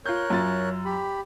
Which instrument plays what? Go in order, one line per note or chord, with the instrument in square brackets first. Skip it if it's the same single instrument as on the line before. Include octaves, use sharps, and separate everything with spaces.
[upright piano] F4 G6 [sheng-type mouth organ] A#4 C#5 F#6
[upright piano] F#2 F4 A6
[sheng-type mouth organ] G4 B5